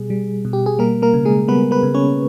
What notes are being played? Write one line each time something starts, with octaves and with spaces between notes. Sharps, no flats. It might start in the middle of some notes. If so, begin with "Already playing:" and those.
Already playing: B2 G3 G#4
G3
B2
G4
G#4
G3 A#3 A#4
A#3 A#4
C#3
G#3 G#4
G3 B3 B4
B3 B4
C#3
C#4 C#5